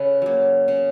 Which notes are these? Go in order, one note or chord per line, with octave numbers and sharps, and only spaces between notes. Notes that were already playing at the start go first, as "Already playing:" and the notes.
Already playing: C#3 A4 B4
F#3 A#3
C#3